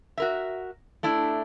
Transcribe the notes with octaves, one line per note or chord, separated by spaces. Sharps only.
F#4 A#4 E5
A3 D4 E4